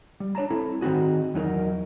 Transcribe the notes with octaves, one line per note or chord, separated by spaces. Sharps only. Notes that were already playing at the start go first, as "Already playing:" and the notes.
G3
D4 C#5 A5 A#5
C4 E4 A4
D#3 C4 D#4 F#4 G#4
E2 F#3 D#4 A#4